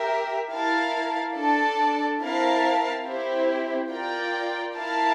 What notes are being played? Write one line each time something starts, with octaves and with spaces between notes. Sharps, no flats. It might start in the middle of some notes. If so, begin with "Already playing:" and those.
Already playing: G4 A#4 E5
E4 A#4 F5 A5
D4 A4 D5 A5
C4 E4 A#4 F5 A5
C4 E4 G4 C5
F4 A#4 D5 G5
E4 A#4 F5 A5